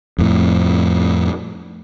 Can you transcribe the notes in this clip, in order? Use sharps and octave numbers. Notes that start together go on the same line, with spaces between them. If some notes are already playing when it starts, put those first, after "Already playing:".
F2 A2